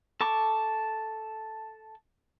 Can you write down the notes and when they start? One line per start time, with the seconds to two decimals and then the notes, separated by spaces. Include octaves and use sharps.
0.21 A4 A5 C#6 D6